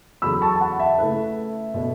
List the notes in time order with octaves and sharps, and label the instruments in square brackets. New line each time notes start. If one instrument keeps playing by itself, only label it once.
[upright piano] E2 C#3 F#3 B3 A4 [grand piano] B5 E6
[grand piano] A5 C#6
A5
F#5 B5
E5 A5
[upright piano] C#3 A3 E4 B4
B2 B3 A4